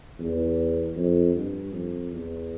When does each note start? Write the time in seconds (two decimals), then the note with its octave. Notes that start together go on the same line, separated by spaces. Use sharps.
0.19 E2
0.96 F2
1.35 G2
1.72 F2
2.11 E2